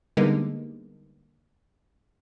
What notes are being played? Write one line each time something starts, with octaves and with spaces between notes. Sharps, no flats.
D3 G3 G#3 A#3 B3 D#4